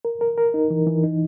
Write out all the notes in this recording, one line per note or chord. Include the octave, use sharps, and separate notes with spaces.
A#4
A#4
A#4
D#4
E3
E3
D#4